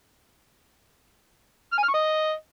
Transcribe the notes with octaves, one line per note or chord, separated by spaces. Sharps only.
F6
G#5
F6
C#6
D#5